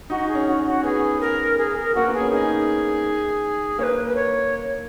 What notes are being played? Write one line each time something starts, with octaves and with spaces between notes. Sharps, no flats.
D#4 F#4
G#4
C#4
F#4
C#4
F#4
B3 G#4
A#4
G#4
A#4
A#3 F#4
B3
G#4
C#4
D#4 G#4
A#3 B4 C#5
B4
C#5